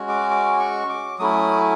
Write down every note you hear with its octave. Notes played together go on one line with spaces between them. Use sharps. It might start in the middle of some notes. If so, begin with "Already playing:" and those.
Already playing: G#3 C#4 F#4
D6
D6
C#6
D6
F#3 A3 C#4 E4 D#6